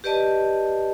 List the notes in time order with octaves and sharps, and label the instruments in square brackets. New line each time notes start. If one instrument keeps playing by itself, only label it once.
[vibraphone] G4 B4 D5 D#5 A5